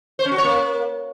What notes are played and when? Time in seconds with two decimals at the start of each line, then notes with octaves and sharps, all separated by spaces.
0.19 C5
0.25 C#4
0.32 F#4
0.38 C#5
0.44 A#3